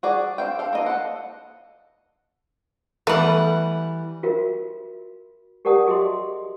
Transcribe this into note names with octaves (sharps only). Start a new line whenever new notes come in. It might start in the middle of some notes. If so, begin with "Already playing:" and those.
F#4 G#4 D5
C4 F5 G5
A4 F5
A#3 D#5
A4 F#5
E3 G3 A3 B3 F#5
F4 F#4 A#4 E5
G4 A#4 D5 F#5 A5 D#6
F#4 G#4 D#5 E5 C6